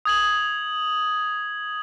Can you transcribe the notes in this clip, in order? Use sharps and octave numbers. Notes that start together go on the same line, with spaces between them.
D#6 G#6 F#7